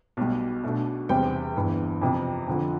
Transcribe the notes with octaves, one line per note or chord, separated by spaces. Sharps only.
B1 B2 G3
B1 B2 A3 D4
E2 C3 G3 C4 G5
G1 G2 E3
F2 C3 F3
F2 D3 F3